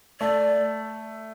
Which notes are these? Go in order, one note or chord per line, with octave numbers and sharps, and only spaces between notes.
A3 D5